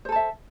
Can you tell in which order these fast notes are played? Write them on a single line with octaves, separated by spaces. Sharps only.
C5 A4 A5 E5